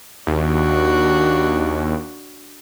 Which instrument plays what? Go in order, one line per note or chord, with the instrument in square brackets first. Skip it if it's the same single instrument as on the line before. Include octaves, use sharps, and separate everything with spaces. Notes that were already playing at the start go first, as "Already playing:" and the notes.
[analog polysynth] D#2 [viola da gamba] D4 F#4